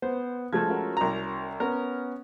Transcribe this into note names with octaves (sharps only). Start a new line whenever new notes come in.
B3 C5
F3 G#3 A3 G#6
C#4 F#4 A#4
C2 A#5
B3 C#4 A#4